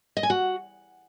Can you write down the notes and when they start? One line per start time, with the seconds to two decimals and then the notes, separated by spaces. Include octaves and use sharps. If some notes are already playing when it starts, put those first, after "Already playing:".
0.17 D#5
0.23 G#5
0.30 F#4